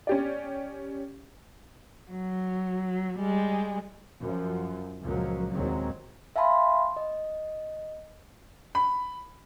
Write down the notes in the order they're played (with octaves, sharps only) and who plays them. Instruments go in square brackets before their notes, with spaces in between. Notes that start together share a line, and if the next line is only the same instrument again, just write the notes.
[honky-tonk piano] C#4 G4 D5
[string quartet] F#3
G3 G#3
[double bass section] F#2 F3
C#2 F#2 A#2 F3 F#3 A#3
D#2 A#2 F#3 G#3 C4
[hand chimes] E5 F5 G#5 A5 B5 C6
D#5
[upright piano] B5